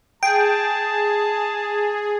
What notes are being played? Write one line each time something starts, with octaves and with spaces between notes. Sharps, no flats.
G#4 G5 A5